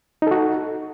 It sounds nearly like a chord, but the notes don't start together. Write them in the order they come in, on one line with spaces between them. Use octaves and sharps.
D#4 A4 F#4